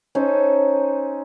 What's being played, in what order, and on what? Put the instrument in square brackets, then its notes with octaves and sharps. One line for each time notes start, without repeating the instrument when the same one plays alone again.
[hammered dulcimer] C#4 D#4 A4 C5